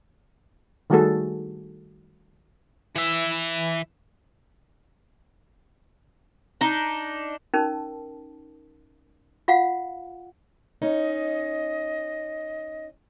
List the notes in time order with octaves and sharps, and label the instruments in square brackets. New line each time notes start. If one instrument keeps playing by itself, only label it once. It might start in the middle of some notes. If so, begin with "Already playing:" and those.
[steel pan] D#3 G3 A3 F#4 G#4 A4
[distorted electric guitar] E3 E5
[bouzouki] D4 D#4
[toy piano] C#4 D#4 A#4 A5
F4 F5 F#5
[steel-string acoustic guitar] C#4 D#4 [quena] D#5